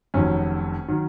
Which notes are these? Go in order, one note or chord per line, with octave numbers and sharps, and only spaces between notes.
F1 F2 D#3 F#3 C#4
D#3 F#3